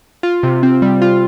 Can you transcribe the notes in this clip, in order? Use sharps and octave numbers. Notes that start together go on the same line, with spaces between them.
F4
C3
C4
G3
F4